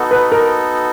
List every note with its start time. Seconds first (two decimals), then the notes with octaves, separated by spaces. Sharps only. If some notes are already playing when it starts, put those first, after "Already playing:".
Already playing: B3 D#4 F#4 A4
0.11 B4
0.32 A#4